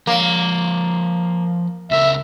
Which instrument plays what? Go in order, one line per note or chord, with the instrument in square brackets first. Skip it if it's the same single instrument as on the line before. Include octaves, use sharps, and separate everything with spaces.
[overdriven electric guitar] F3 C#5 [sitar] A#3
[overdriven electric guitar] C#2 A#4 [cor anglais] E5